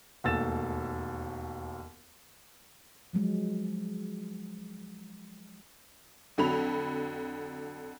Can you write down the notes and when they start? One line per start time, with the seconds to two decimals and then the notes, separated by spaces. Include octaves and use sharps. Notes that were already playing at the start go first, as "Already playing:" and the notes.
0.24 E1 D#2 A3 E6 A6 E7
3.13 F3 F#3 G#3
6.38 F2 D3 F#3 B5 F7